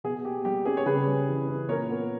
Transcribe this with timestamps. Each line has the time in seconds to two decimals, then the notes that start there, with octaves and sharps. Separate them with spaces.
0.04 B2 G#4
0.25 A#3 G4
0.45 G3 G4
0.65 C#4 G#4
0.77 C#5
0.86 C#3 G#4 B4
1.07 G3
1.28 E3
1.48 C#4
1.68 A#2 A#4 C#5
1.89 B3